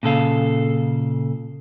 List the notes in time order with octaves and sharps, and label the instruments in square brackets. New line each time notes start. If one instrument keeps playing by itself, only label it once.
[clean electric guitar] A#2 C#3 A4 F5